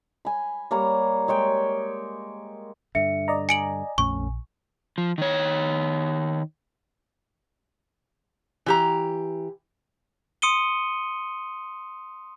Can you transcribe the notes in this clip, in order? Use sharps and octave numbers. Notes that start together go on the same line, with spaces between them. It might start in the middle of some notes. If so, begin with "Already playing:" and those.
G#5 B5
G3 A#3 C#5 A#5
G#3 C#5 G5
G2 D3 E5 C#7
D5 D#5 A#5
G#5 C#7 D7 F#7
A#1 F2 A3 C#4 C#6
F3
D#3 C#5
E3 G4 A#5
C6 D#6 C#7 D#7 G7